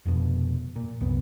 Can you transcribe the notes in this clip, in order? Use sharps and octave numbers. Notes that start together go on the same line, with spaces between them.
F1 F2 B2
A#2
C2 F#2 B3